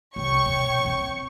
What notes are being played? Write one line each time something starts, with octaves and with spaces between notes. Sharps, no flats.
C2 C#5 G5 C#6
B2
C4